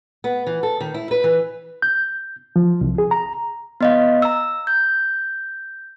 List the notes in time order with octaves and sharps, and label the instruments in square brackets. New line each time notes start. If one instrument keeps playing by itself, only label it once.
[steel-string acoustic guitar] B3
E3
A4
D#3
E4
B4
E3
[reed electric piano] G6
F3
C2
G#4
A#5
[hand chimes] B3 D#5 F5
A#5 E6
G6